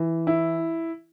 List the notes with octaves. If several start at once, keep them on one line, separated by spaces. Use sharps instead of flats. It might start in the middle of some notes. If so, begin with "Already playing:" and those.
Already playing: E3
E4